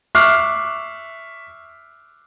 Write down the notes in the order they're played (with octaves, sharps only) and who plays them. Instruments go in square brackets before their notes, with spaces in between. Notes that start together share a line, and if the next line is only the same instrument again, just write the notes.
[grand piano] E5 C#6 D6 F6 F#6 C7